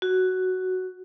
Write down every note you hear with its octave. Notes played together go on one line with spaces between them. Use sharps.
F#4